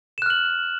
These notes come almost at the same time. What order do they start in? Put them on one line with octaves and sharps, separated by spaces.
E7 F#6 F6 F#7